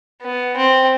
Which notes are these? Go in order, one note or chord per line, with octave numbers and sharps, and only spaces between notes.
B3
C4